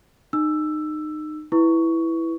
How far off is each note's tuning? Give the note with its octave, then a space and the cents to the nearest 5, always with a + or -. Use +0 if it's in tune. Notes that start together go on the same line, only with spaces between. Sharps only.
D#4 -25 E6 +10
E4 +0 B4 +0 C#6 +10